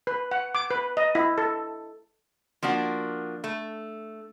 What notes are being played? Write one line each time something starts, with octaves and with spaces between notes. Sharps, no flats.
B4
F#5
D6
B4
D#5
E4
A4
F3 A#3 D4 F#4
A3